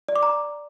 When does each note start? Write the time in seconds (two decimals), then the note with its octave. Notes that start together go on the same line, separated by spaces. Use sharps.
0.08 D5
0.16 D6
0.23 A#5